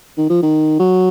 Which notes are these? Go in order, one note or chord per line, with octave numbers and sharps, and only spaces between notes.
D#3
F3
D#3
F#3